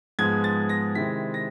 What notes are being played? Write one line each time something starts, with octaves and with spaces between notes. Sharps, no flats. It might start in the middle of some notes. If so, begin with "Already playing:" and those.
G#2 F3 G#3 B3 G#6
A6
A#6
C3 D#3 G#3 C4 E4 B6
A#6